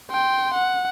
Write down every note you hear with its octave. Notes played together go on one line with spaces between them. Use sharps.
G5 C6
F#5